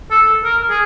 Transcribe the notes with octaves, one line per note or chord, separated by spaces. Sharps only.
A4
A#4
G#4